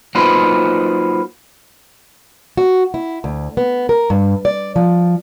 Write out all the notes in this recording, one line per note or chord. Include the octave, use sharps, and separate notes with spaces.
F#3 A#3 D#4 F4 B4 C5
F#4
E4
D2
B3
A#4
G2
D5
F3